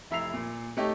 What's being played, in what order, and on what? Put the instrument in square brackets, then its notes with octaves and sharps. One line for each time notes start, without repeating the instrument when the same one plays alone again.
[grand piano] F1 E4 E5 A#5 C7 F7
A#2
A3 D#4 G4 A4 C#5